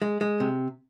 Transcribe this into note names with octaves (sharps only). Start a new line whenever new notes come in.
G#3
G#3
C3